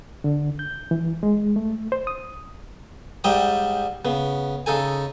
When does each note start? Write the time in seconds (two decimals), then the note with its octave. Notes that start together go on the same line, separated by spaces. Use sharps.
0.24 D3
0.59 G6
0.91 E3
1.23 G#3
1.56 A3
1.92 C5
2.07 D#6
3.24 G#2 G3 E5 G5 D#6
4.05 C#3 B3
4.66 C#3 D#4 A4 G#5